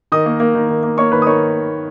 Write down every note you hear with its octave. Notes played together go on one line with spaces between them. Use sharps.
D#3 D#5 D#6
A#3
A#3
D#3
D#3
A#3
A#3 C#5 C#6
D#3 B4 B5
D#6
D#3 C#5 C#6